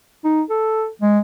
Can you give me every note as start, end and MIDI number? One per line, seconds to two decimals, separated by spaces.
0.24 0.42 63
0.50 0.88 69
1.02 1.19 56